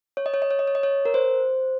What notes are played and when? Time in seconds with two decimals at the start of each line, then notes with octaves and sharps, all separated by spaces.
0.17 C#5
0.26 D#5
0.34 C#5
0.42 D#5
0.51 C#5
0.59 D#5
0.67 C#5
0.75 D#5
0.83 C#5
1.05 A#4
1.14 C5